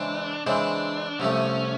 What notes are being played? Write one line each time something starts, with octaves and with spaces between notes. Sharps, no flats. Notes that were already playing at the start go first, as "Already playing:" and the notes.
Already playing: C#3 E3 G#3 C4 D4
C#3 E3 G#3 C4 D4
C2 C3 F3 A3 C#4